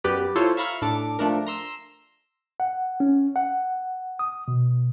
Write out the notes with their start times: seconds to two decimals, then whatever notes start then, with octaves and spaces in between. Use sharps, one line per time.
0.04 F#2 B3 G4 B4 D5
0.36 E4 F4 A4 C5 C#5
0.57 E5 F5 A#5 B5 C#6 F6
0.82 A2 D4 A4 D6
1.19 F3 A3 D4 A#4
1.47 A#5 C6 E6
2.60 F#5
3.00 C#4
3.36 F#5
4.19 D#6
4.48 B2